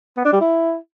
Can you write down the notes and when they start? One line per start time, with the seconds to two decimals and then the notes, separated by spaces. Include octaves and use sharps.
0.17 B3
0.25 D4
0.33 G3
0.41 E4